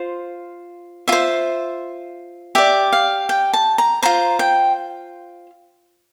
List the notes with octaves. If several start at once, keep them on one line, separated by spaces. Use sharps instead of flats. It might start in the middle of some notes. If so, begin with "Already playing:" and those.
Already playing: F4 C5
F4 C5 E5
G4 D5 E5
F5
G5
A5
A#5
F4 C5 A#5
G5